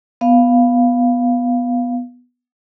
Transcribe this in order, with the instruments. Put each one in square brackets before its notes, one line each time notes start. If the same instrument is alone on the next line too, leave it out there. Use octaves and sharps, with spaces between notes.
[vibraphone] B3 F5